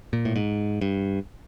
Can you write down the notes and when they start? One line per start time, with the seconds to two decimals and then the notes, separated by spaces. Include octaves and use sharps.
0.13 A#2
0.25 A2
0.36 G#2
0.81 G2